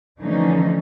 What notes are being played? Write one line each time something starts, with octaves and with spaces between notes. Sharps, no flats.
D3 E3 F3 A3 C#4 D#4